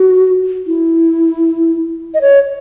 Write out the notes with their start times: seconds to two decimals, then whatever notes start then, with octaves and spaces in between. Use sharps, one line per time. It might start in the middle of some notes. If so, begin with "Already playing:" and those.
Already playing: F#4
0.67 E4
2.14 D#5
2.21 C#5